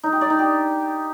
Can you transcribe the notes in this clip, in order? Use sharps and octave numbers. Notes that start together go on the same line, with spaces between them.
D#4
G4
D5
D#4
G4